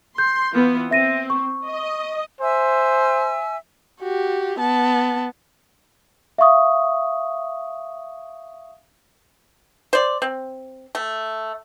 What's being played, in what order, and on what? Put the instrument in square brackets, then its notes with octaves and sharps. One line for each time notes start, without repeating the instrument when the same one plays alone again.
[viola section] C6 [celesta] G6
[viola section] E3 B3 F4
[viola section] C4 [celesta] E5 A#6 D#7
[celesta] C#6
[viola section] D#5
[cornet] C5 [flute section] E5 G#5 E6
[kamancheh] F#4 G4
B3 A5
[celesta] E5 F5 C#6 D#6
[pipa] C5 D5
C4
A3